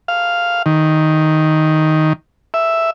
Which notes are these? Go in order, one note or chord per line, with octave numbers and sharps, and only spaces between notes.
F5
D#3
E5